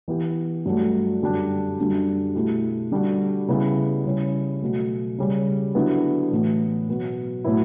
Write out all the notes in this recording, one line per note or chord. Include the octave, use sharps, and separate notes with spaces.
E3 B3 E4 G4
G2 F#3 A3
F#2 D3 G3 D4 G4
F#2 D3 G3
B2 A3 E4 G4
D3 G3 D4 F#4
C#3 G3 B3 E4
C#3 G3 C#4 E4 G4
B2 F#3 A3
C#3 G3 C#4
D3 F#3 B3 E4 G4
A2 E3 B3 F#4
B2 F#3 B3 F#4
A2 F#3 B3 E4